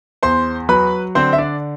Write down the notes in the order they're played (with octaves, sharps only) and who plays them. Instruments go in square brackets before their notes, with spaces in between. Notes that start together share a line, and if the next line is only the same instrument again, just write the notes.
[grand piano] E2 C5 C6
F#3 B4 B5
D3 C4 C5
E5
D4 D5